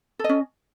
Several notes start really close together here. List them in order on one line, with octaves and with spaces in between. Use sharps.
A4 D#5 C#4